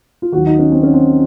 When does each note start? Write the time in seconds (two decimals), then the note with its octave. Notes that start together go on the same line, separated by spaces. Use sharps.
0.22 F4
0.32 D#2 D#3 F#3 F#4
0.47 D#4
0.59 C#4
0.72 C4
0.83 C#4
0.94 C4